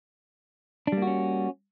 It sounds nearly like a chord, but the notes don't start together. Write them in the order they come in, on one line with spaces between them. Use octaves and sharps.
D4 G3 A#3 F#4 C#4